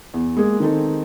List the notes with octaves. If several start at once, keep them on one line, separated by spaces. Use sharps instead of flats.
E2
G#3 A#3 G#4
D#3 C4 D#4 A4